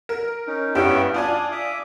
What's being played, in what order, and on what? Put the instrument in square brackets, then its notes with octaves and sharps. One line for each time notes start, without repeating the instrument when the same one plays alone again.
[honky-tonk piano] A#4
[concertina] C#4 D#4
[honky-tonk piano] G2 G3 E4 [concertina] B3 C#4 G5
[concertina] D4 D#6 [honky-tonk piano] F4 D5 G#5
[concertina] E5 D6 D#6